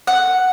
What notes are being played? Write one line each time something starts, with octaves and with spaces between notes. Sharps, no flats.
F#5